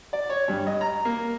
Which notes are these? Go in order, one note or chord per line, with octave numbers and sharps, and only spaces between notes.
D5
C#5
G2
D#5
A#5
A#3